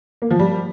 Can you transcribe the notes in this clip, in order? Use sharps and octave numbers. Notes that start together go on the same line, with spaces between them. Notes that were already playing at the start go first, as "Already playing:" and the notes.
A#3
F3
G3